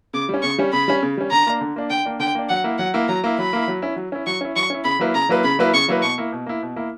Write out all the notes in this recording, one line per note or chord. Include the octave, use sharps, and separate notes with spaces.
C#3 D6
G3 C#4
C#3 C#6
G3 C#4
C#3 B5
G3 C#4
C#3
G3 C#4
D3 A#5
A#3 D4
D3
A#3 D4
D3 G5
A#3 D4
D3 G5
A#3 D4
F#3 F#5
A#3 E4
F#3 F#5
A#3 E4
F#3 A#5
A#3 E4
F#3 B5
A#3 E4
F#3
C#4 E4
F#3
C#4 E4
F#3 C#6
C#4 E4
F#3 C#6
C#4 E4
C#3 B5
F#3 A#3 E4 B4
C#3 A#5
F#3 A#3 E4 B4
C#3 B5
F#3 A#3 E4 B4
C#3 C#6
F#3 A#3 E4 B4
B2 C#6
A#3 E4
B2
A#3 E4
B2
A#3 E4